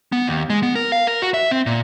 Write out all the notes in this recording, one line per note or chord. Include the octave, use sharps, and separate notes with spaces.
B3
D#2
G#3
B3
A#4
F5
A#4
F#4
E5
C4
A#2